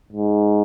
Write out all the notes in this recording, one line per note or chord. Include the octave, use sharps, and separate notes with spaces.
G#2